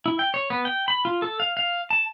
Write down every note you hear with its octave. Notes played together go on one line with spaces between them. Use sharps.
E4
G5
C#5
B3
G5
B5
F4
A4
F5
F5
A5